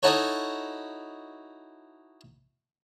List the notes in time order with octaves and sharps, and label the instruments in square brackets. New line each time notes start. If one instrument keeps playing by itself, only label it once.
[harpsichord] D#4 E4 F#4 A4 C#5